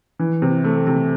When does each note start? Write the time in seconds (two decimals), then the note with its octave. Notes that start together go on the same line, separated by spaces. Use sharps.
0.19 E3
0.42 C3
0.64 A3
0.87 C3